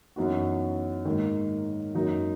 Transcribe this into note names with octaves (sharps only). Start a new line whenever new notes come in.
F#2 E3 B3 D#4 F#4
G#2 D#3 A#3
F#2 D#3 F#3 A#3 D#4